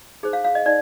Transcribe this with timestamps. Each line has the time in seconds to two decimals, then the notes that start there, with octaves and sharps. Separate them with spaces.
0.23 D#4 G#4 C5
0.33 F5
0.44 F5
0.55 D#5
0.66 D#4 D5